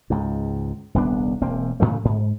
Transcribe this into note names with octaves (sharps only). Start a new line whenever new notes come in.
C#2 G#2
D#1 C2 B3 D4
E1 A#3 C4
A2 C#3 E3 A3
G#2